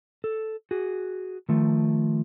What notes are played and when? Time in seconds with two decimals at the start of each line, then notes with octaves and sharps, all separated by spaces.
0.24 A4
0.71 F#4 G#4
1.49 D#3 F3 A3